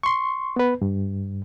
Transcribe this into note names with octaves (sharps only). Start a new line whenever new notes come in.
C6 C#6
B3 B4
G2